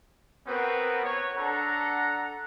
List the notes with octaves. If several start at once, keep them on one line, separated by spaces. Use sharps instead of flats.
B3 C4 F#4 A#4 B4
C#5
D4 A4 F#5 A#5